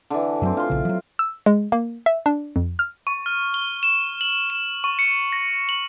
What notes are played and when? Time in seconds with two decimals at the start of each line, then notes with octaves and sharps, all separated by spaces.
0.10 D3 E3
0.42 F#2 A2 F#3 C4
0.57 D4 F4 C6
0.70 A#1 C#3
0.85 F3 F#3
1.19 E6
1.46 G#3
1.72 A#3
2.06 E5
2.26 D4
2.56 F2
2.79 F6
3.07 C#6
3.26 F6
3.54 G7
3.83 E7
4.21 F#7
4.50 E7
4.84 C#6
4.99 C#7
5.32 A#6
5.69 F#7